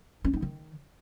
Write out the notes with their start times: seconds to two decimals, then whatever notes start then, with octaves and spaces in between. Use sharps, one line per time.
0.24 C#4
0.33 D#4
0.42 D#3